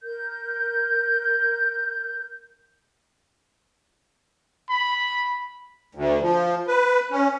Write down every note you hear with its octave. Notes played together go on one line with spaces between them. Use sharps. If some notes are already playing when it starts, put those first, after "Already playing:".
A#4 G6
B5
D2
F3
B4
C#4